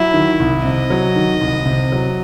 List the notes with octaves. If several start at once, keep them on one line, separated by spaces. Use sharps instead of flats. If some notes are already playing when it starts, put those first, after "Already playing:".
Already playing: F#3 E4
D#3
C2
C3 D#5
F#3
D#3
C2
C3
F#3